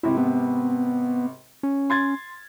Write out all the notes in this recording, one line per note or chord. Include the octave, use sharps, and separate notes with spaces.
G#1 C3 E4
B3
C#4
C6 G#6 A6